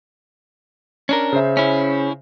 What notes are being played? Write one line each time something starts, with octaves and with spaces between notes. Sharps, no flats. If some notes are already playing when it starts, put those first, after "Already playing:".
C#4 D4 A#4
C#3 C5 E5
C#4 E4